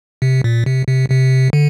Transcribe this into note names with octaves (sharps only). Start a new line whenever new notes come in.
C3
A#2
C3
C3
C3
D3